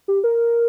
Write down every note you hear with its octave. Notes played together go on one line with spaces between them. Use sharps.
G4
A#4